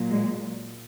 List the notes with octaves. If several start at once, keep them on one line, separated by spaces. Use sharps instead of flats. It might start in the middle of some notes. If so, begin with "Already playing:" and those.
Already playing: A#2 F#3
G#3